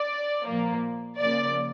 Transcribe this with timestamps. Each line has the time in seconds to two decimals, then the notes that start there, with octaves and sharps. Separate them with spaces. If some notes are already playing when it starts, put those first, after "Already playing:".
Already playing: D5
0.48 A#2 F3 A#3
1.21 C#3 F3 A#3 D5